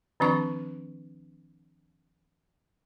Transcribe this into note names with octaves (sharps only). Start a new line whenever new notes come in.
D#3 F3 C4 D4 C#6